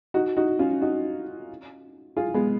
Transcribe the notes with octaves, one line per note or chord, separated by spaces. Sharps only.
D#4 F#4
D#4 F#4
C#4 F4
D#4 F#4
F4 G#4
G#3 B3